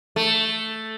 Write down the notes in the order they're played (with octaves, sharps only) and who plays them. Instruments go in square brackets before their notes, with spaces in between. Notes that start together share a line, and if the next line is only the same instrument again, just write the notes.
[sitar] A3